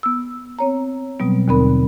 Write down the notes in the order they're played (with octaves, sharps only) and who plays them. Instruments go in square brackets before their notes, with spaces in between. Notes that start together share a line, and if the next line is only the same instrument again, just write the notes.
[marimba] B3 E6
C4 C#5 A#5
B2 F#3 G3 B3 C4
D#2 B2 D3 C4 A#4 B5